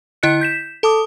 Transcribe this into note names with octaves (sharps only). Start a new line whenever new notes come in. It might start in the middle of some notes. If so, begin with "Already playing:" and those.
D3 E4 D#5 F#6 C#7
G6 B6 E7
A4 A5 D6 D#6